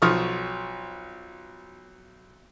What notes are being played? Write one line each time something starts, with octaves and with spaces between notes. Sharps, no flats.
B1 F3 C#6 D#6 F6